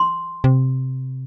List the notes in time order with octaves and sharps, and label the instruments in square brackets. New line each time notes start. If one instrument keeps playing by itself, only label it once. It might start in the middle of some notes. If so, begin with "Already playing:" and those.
Already playing: [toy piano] C6
[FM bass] C3